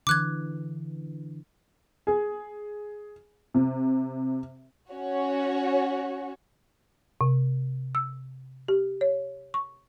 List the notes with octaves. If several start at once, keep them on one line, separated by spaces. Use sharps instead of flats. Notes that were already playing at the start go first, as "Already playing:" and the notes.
D3 E3 D6 F#6 G#6
G#4
C3
C#4 F#4 C#5
C3
E6
G4
C#5
C#6